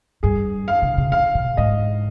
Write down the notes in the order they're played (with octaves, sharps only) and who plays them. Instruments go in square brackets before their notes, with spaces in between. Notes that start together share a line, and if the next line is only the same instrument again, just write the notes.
[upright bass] G2 [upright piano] G#4
[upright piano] F5
[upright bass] C3
C3
[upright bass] C3 [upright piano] F5
[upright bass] B2
[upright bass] G#2 [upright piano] D#5